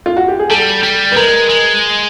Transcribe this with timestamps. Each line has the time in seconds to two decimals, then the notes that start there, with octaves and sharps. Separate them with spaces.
0.06 F4
0.17 F#4
0.28 G4
0.39 G#4
0.50 G3 A4
0.83 G3
1.12 B4
1.16 G#3 A#4
1.49 G#3